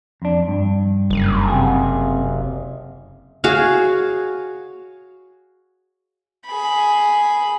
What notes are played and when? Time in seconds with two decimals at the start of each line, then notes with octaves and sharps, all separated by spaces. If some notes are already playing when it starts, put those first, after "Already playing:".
0.22 F2 D4
0.48 G2
1.10 F#1
1.48 C3 G#4
3.44 F#4 G#4 C#5 F5
6.46 G#4 B5